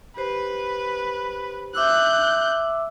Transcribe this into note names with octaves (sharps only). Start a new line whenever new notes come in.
G4 B4 C5
E5 D6 E6 F#6 G6